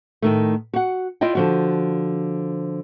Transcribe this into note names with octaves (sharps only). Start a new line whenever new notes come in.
A2 D#3 A3
F#4 F#5
E4 F4 D5 D#5 G5
D3 F3 F#4